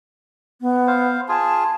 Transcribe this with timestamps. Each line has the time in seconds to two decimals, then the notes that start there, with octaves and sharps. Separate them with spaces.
0.61 B3
0.87 C5 F5
1.29 F4 G#4 A5